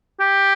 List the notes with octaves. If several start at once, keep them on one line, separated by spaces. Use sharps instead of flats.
G4